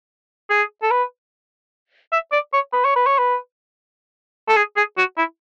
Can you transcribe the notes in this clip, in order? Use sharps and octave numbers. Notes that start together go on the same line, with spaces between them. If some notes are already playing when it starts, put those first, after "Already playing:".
G#4
A4
B4
E5
D5
C#5
B4
C#5
B4
C#5
B4
A4
G#4
G#4
F#4
E4